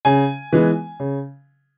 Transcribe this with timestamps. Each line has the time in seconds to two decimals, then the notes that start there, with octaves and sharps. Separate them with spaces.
0.05 C#3 G#5
0.53 E3 G#3 B3
1.00 C#3